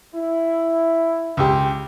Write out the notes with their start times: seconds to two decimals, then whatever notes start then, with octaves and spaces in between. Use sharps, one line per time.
0.15 E4
1.37 C#2 G4